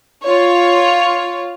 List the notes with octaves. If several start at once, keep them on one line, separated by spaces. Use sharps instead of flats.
F4 C#5